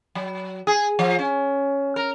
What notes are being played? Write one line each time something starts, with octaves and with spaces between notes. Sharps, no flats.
F#3
G#4
F3
C#4
A#4